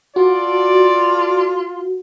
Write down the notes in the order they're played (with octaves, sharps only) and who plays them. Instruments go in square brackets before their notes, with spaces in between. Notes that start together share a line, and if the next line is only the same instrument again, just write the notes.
[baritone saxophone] F4 [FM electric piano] F#4 [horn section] A4 D5